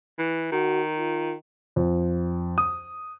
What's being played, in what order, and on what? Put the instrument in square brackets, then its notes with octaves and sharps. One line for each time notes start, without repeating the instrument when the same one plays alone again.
[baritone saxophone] E3
[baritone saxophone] D#3 [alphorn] F#4
[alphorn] F4
[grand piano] F2
D#6